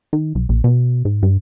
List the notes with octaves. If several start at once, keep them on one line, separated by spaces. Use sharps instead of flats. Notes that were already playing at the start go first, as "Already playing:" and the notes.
D#3
B1
A#1
B2
G#2
G2